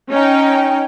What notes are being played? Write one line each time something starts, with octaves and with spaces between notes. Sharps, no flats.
C#4 D#4 G5